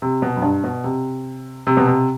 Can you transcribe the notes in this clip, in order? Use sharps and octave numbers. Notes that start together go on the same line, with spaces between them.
C3
B2
F#2
G2
B2
C3
C3
B2
C3